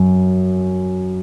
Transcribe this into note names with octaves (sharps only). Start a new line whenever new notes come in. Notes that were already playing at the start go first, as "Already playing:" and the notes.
Already playing: F#2